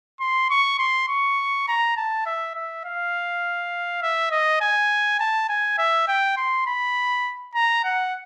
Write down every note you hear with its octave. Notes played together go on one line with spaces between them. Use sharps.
C6
C#6
C6
C#6
A#5
A5
E5
E5
F5
E5
D#5
G#5
A5
G#5
E5
G5
C6
B5
A#5
F#5